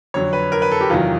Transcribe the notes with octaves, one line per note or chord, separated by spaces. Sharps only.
F2 D3 F#3 C#5
B4
A#4
B4
A4
G4
E2 C3 D#3 F#3 F4